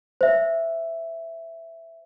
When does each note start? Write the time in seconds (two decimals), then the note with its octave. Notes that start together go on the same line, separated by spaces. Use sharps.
0.21 C5 E5